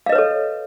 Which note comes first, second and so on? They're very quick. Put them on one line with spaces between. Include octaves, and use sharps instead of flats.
F5 D#5 B4 C#5 A4